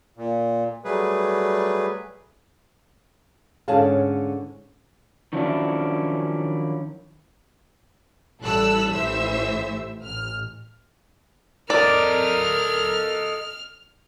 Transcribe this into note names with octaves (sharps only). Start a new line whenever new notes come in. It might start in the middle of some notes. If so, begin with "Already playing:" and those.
A#2
F#3 G3 A3 G#4 B4
G#2 D3 C#4 G#4 F5 A5
D#3 F3 F#3 C#4 D4 E4
A1 G3 E4 A4 E6 F#6
A1 A2 E3 C5 E5 E6
A1 F6
A4 A#4 D5 D#5 F6